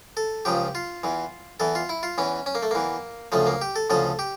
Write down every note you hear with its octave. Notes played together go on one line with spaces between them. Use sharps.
A4
C#2 C#3 F3 G4
F4
E2 E3
E2 E3 A4
F4
E4
F4
E2 E3 C#4
C#4
A#3
A3
E2 E3 A#3
D2 C#3 F3 A3
A#3
G4
A4
D2 C#3 F3 A4
G4